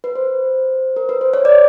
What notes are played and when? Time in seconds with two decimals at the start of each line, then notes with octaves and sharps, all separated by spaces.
0.04 B4
0.15 C5
0.96 A#4
1.09 B4
1.21 C5
1.34 C#5
1.45 D5